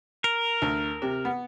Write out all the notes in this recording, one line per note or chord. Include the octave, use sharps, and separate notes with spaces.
A#4
D2
C3
B3